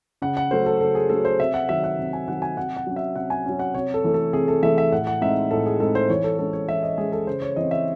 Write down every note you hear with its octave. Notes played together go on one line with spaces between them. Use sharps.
C#3 F#5
F#5
F#3 A3 C#4 C5
A4
C#3 A4
G#4
F#3 A3 C#4 A4
C5
C3 E5
F#5
D#3 F#3 E5
F#5
C3
G#5
D#3 F#3 F#5
G#5
C3 F#5
F#5
F#3 C#4
E5
C3 F#5
G#5
F#3 C#4
F#5
C3 C#5
A4
E3 A3
A4
C3 G#4
A4
E3 A3 E5
E5
A2 F#5
F#5
G#3 C4 D#4 E5
A2 A4
G#4
G#3 C4 D#4 A4
C5
E3 C#5
A4
G#3 C#4 A4
C#5
E3 E5
D#5
G#3 C#4 G#4
A4
C#3 C5
C#5
E3 C4 D#5
E5